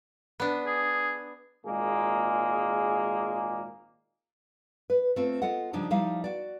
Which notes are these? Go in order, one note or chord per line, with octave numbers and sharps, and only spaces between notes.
B3 D4
G#4
G#1 A#2 G#3 A#3 G#4
B4
A3 C4 F4
F4 A4 D#5 F#5
C#3 F3 G3 D4 D#4 C5
F3 G3 D#4 E4 F5
F#4 D5